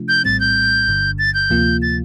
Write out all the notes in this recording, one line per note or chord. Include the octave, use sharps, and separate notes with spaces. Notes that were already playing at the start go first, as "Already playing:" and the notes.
Already playing: C3 F3 A3 D4 F4
G6
A#1 A2 G3 C4 A6
G6
G1 G2 D3
A6
G6
D2 C3 F3 A#3 F4
A6